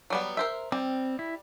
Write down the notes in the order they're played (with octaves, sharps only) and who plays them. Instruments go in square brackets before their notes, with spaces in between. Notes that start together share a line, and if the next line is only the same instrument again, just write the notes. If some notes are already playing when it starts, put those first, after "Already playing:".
[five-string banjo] F#3 G3 B3
A#4 C5 E5
[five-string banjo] G3 [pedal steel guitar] C4
[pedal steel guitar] E4